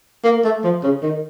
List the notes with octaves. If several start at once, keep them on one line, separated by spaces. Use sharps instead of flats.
A#3
A3
F3
C#3
D#3